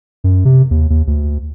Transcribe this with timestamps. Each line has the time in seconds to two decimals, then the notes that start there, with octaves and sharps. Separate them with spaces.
0.24 F#2
0.45 C3
0.71 D#2
0.90 D#2
1.07 D2